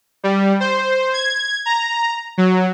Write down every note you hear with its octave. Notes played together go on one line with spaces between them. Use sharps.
G3
C5
G#6
A#5
F#3